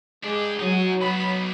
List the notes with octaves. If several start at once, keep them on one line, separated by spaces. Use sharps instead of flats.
G#3 D4 G4
F#3 D#4 G#5
D#3 B3 B5